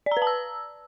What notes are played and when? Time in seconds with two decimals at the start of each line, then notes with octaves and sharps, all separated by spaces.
0.06 D5
0.11 A#5
0.17 B4
0.22 A5
0.27 E6